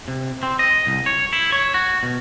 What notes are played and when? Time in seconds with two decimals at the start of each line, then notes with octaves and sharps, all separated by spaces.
0.08 C3
0.43 C4
0.59 D#5
0.87 C2
1.06 C#5
1.33 E4
1.52 C#5
1.74 F#4
2.03 B2